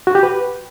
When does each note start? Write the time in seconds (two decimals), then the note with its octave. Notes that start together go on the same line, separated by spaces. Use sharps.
0.07 F#4
0.15 G4
0.23 B4